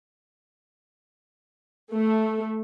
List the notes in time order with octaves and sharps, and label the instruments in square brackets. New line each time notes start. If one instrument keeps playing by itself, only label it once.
[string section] A3